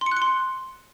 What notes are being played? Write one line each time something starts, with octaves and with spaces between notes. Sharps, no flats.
C6
C#7
F#6
C#7
C6